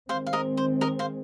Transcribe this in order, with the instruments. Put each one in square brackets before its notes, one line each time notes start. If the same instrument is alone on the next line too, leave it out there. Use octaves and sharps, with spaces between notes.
[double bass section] D#3 G#3 C4 [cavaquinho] C5 F5
[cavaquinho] F5
A#4 D#5
C5
A#4 D#5
C5 F5